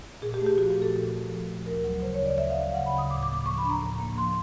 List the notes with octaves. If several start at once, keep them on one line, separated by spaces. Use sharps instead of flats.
A#2 G#4
G4
A3
G4
F3 F#4
G4
A#2
A4
A#2
A3
F3
A#2
D2 A#4
F#3
C#3 C5
C#5
D2
D5
D2 E5
F5
F#3
F5
C#3 F#5
B5
D2
D#6
A2 D6
D6
A#3
D6
F3 C#6
B5
D4
A#5
A2
A#3
F3 C6